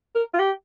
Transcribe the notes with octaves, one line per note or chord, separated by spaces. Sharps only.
A#4
F4
G4